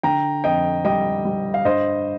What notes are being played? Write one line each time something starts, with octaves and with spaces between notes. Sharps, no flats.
D3 G5 A#5
F2 D#5 G5
G3 D#5 G5
G3
F5
G2 C5 D#5